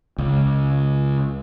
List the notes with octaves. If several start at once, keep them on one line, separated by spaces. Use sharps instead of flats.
C#2